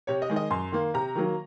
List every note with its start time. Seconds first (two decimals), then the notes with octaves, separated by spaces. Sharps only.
0.07 C3 C#5
0.22 D#5
0.30 D#3 G#3
0.36 D#5
0.50 F#2 C6
0.72 D#3 A#3
0.94 C3 A#5
1.15 D#3 F#3 A#3